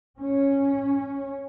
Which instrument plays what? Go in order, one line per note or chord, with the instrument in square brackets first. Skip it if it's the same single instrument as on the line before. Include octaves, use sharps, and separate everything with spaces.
[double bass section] C#4